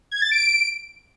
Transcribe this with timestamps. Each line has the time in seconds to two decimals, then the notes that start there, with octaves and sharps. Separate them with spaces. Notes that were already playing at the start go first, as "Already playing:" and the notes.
0.11 G#6
0.21 A6
0.31 D7